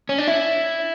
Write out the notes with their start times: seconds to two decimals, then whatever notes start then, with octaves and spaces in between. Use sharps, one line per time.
0.09 C#4
0.18 D4
0.27 E4